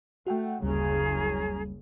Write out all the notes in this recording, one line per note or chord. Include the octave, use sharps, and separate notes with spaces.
A3 F#4 F#5 G5
F#1 D2 C#3 G3 C#4 G#4 A#5